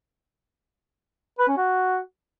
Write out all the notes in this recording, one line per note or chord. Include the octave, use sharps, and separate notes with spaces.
B4
C#4
F#4